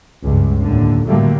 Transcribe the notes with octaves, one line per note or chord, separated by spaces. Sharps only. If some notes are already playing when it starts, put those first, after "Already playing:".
C#2 G2
D#2 A2 D3
A2 D3 F#3 G3 A3 A#3